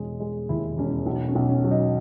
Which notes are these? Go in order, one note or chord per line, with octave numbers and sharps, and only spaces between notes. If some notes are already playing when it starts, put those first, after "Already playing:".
Already playing: E1 G#3
G#3
D#2 E4
E1 C#4
B1
C#4
B1
C#4
F#3
D#4